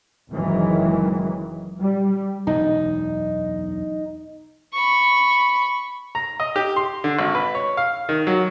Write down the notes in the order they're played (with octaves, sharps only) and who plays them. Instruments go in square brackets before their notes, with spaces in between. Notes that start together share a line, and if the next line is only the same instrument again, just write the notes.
[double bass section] F#1 D#3 E3 F#3 G#3
G3
[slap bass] E1 B1 F#2 [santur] D#4
[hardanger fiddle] B5 C#6
[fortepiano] A#5
D#5
G4
C6
D3
G#1
B4
C#5
F5
D#3
F#3